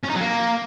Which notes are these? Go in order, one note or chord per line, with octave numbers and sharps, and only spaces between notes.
C#4
D#4
F#3
A#3